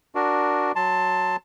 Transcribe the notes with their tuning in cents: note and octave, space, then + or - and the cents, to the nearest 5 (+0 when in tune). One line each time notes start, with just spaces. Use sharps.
D4 +0 F#4 +0 A#4 +0
F#3 +0 A5 +10 C6 +0